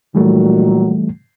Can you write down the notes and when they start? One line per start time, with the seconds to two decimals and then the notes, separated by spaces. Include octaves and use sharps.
0.15 A#2 D#3 E3 F#3 G3 A3